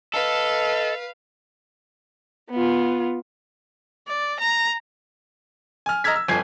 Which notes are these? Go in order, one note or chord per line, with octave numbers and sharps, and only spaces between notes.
A4 B4 D#5 F5
B3 F4
D5
A#5
G#5 F6
D#5 A#5 E6 F6 G#6 B6
E6
G1 F2 G#5 G#6 C7